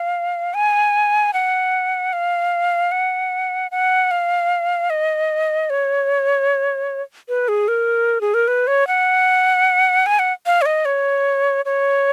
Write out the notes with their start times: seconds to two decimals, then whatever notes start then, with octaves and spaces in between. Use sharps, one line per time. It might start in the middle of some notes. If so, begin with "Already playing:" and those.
Already playing: F5
0.54 G#5
1.33 F#5
2.13 F5
2.92 F#5
3.71 F#5
4.11 F5
4.90 D#5
5.70 C#5
7.29 B4
7.48 G#4
7.68 A#4
8.21 G#4
8.34 A#4
8.48 B4
8.67 C#5
8.87 F#5
10.06 G#5
10.19 F#5
10.46 F5
10.62 C#5
10.66 D#5
10.85 C#5
11.65 C#5